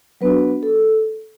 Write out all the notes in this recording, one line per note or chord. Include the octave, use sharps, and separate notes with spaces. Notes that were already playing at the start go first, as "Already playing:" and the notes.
F#3 B3 D4 F#4 B4
A4